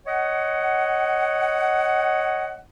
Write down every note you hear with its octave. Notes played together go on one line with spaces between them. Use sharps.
C#5 D#5 F#5